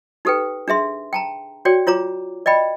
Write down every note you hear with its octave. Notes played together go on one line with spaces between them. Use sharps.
D#4 G4 A4 B4 G5
D4 G#4 E5 C6
G5 A5 A#5
F#4 C#5 D5 G5
F4 C#5 A#5 D6
D5 D#5 G5 B5